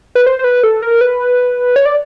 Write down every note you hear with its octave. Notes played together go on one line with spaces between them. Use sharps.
B4
C5
C5
B4
A4
A#4
B4
C#5
D5